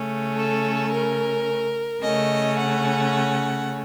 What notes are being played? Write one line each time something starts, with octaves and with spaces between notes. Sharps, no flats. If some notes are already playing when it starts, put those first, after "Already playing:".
Already playing: C#3 A3 C#4
A4
A#4
C#3 A3 C#4 D#5
F#5